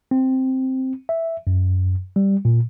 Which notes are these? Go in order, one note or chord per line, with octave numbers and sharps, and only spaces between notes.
C4
E5
F#2
G3
A#2